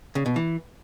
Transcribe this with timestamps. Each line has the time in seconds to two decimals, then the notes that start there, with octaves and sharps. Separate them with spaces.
0.15 C#3
0.26 B2
0.36 E3